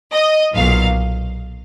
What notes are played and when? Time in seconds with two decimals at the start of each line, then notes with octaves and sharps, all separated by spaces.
0.13 D#5
0.54 B1 A#2 F#3 F5